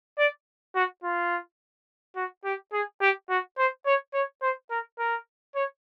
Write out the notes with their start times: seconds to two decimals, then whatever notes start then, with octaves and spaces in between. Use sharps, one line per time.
0.18 D5
0.75 F#4
1.04 F4
2.16 F#4
2.45 G4
2.73 G#4
3.01 G4
3.30 F#4
3.58 C5
3.86 C#5
4.14 C#5
4.42 C5
4.71 A#4
4.99 A#4
5.55 C#5